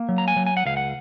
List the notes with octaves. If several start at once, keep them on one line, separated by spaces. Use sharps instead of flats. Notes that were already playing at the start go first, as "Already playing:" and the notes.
Already playing: A#3
F#3
A#5
G#5
F#3
G#5
F#5
C#2 F5
F#5